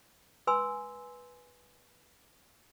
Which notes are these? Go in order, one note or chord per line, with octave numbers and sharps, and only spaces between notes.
B4 G#5 C6 E6